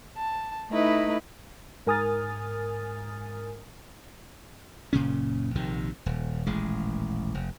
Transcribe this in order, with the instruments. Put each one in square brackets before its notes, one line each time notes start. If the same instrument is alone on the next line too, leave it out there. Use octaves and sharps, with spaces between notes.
[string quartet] A5
A3 D#4 E4 B4 D#5
[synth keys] G#2 A#4 G#5 D#6 F6 A6
[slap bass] F#1 A#2 C#3 C#4
A#1 C3 D#3
D#1
D#1 A1 G#3
F1